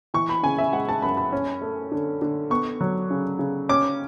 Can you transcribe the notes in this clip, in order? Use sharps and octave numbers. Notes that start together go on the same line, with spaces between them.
E3 C#6
B5
C#3 G#5
E5
G#3 F#5
A5
F#2 B5
B5
C#4
A3
D3
D3
B3 C#6
F#3
C#3
C#3
C#4 D6